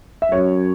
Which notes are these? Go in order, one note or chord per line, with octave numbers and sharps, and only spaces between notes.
E5
F#2 C#5